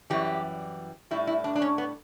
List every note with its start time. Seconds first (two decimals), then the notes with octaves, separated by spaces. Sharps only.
0.10 F#2 E3 G3 G4
1.11 A2 G3 E4
1.27 E4
1.44 D4
1.56 D4
1.62 C#4
1.78 B3